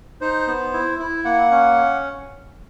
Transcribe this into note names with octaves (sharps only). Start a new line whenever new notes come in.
D#4 C5
B3
E4
E4
A#3 F#5
C#4